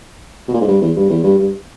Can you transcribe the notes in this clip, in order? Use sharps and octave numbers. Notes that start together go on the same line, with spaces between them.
B2
A#2
G#2
G2
E2
G2
E2
G2
G2